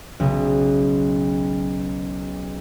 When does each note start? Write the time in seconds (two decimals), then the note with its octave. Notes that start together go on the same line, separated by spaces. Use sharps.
0.20 B1 C#3